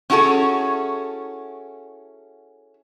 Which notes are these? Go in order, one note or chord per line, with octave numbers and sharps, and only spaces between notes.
C#4 E4 F#4 G#4 A4